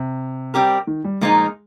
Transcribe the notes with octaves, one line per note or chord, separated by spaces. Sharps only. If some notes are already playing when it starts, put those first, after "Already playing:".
Already playing: C3
G3 C4 G4 A#4
D#3
G3
A#2 F3 G#3 A#3 D#4